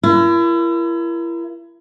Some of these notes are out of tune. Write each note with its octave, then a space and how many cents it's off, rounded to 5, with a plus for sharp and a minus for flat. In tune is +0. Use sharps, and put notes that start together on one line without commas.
E4 +35 A#4 +20